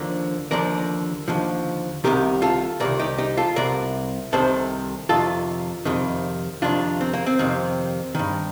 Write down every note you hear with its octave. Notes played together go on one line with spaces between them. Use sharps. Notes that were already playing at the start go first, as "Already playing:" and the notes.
Already playing: D#2 D3 F3 A#4 D5
D#2 D3 F3 A#4 D5
D#2 D3 F3
C2 C3 D#3 G4 A#4
F4 A4
C2 C3 D#3 A#4 D5
D#4 G4
D#4 G4
F4 A4
C2 C3 A#4 D5
C2 C3 D#3 A4 C5
F2 C3 D#3 F4 A4
F2 C3 D#3
F2 C3 D#3 D4 F4
C4
A#3
C4
F2 C3 D#3
G2 D#3